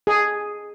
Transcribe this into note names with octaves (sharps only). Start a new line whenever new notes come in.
G#4